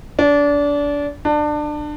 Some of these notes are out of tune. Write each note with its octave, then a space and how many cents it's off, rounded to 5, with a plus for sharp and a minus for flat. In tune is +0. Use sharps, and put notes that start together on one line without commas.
D4 -25
D4 +25